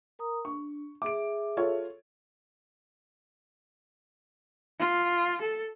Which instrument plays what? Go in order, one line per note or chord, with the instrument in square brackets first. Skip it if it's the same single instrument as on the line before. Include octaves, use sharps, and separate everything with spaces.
[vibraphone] A#4 A#5 D#6
[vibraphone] D4 [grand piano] C#6
[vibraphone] G#4 E5 [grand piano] D6 D7
[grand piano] F4 A4 C#5
[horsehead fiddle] F4
A4